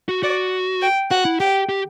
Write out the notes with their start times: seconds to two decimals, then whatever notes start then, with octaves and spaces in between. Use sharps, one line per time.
0.09 F#4
0.23 F#4 D5
0.81 G5
1.11 F#4 F#5
1.25 E4
1.40 G4 G5
1.69 G4